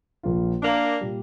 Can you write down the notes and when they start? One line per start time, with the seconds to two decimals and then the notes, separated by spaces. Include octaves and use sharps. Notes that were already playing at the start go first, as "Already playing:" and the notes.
0.23 A#1 A#2 F3 A#3 F4
0.62 A#3 D4
1.01 A#2 G3